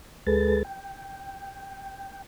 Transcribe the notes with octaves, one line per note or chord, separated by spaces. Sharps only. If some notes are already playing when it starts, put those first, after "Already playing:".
D2 G#3 G#4 A4 B4 A6
G5